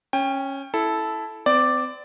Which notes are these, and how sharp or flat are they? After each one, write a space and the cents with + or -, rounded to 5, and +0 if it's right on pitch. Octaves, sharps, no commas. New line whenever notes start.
C#4 -10 G5 +20
E4 +0 A4 -10
C4 -35 D5 +0